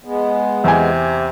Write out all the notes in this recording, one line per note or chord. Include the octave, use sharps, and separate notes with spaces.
G#3 B3
E2 C3 G#5